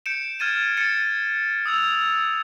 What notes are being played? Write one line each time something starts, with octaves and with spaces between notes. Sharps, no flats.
G6 C#7 D7 E7
F6 G#6 A6 D#7 E7
A6 C#7 D#7 E7
D#6 E6 G#6 F7